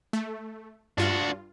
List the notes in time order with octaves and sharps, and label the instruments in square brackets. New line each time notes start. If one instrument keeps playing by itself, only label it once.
[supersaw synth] A3
[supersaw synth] G2 F4 [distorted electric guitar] D4 F#4